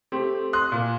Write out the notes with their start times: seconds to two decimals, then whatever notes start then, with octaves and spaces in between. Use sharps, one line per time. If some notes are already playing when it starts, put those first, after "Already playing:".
0.12 A3 C4 G4
0.53 C6 D#6 F#6
0.72 A#2